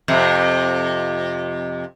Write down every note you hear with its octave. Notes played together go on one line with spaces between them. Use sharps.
F2 C3